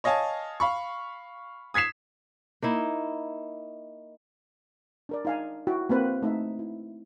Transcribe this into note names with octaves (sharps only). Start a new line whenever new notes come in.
C#5 D#5 F5 G#5 A5
F5 B5 C#6
D#6 G#6 B6 C7 E7
A#3 D#4 E4
D4 A#4 D5
D#4 F5 G#5
E4 F#4 G5
A#3 C4 B4 C5
A3 D#4 E5
E4